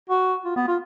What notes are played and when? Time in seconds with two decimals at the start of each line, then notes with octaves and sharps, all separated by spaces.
0.09 F#4
0.45 F4
0.56 B3
0.68 F4